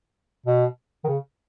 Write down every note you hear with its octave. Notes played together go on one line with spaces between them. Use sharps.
B2
D#3
C#3